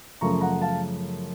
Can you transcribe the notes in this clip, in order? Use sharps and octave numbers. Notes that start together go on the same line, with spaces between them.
F#2 C#3 F3 A3 A#5 C#6
F#5 A#5
F5 A5